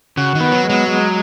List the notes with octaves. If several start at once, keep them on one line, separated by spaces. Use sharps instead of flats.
C#3 F#4
D#3
B3
F#3
G#3
F#3
G#3